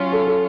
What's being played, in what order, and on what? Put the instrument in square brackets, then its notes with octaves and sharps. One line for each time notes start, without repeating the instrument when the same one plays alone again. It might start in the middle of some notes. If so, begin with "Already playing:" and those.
Already playing: [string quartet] F#3 C#4 F4
[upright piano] A4
A4